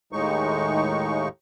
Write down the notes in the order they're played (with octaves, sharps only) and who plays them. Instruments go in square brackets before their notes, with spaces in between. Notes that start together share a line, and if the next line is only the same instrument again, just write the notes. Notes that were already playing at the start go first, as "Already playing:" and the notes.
[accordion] D#2 A2 G#3 D#4 C#6